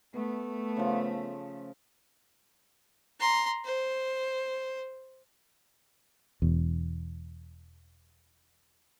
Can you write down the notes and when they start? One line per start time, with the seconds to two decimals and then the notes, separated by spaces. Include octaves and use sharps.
0.15 A3 B3
0.77 C#3 F3
3.20 A#5 C6
3.65 C5
6.42 E1 E2